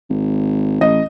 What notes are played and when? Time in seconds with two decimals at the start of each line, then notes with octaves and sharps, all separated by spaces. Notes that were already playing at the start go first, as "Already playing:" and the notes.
0.10 G#1
0.81 A1 D#5